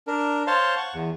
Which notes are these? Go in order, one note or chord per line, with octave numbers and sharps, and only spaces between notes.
D4 A#4
C5 C#5 F5 A5 C6
F#5 C#6
E2